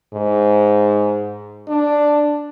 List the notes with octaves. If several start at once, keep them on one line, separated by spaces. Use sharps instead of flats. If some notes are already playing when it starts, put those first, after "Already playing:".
G#2
D4